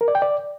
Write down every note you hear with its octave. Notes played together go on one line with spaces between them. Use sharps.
A#4
D5
G5
D5